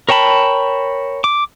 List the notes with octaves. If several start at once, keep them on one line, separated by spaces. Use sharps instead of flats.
A#4 C#5 G5 A5 B5
D6